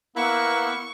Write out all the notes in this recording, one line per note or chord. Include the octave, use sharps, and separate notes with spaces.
A#3 B3 E4 C#6 E6 F#6